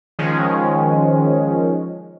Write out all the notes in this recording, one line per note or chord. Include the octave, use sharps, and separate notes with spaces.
D#3 F3 G#3 C#4